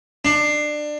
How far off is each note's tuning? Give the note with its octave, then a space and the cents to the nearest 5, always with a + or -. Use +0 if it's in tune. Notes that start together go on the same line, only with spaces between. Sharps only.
D4 +25